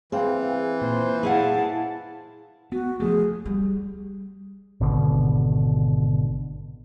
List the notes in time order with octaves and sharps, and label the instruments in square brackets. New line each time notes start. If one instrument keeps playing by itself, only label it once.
[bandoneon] E3 [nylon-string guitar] C4 [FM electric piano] G#4 F5 G5
[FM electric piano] A#2 [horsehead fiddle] C5
[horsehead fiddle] E4 A5 [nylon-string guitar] G#4 F5 F#5
[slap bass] B3 [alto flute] F#4
[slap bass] F3 F#3 A3 [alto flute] G#4
[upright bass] G3
[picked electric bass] G#1 B2 D3